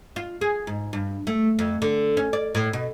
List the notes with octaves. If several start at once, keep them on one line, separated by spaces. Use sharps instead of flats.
F4
G#4
G#2
G2
A3
F2
D3
C#4
D5
A2
B2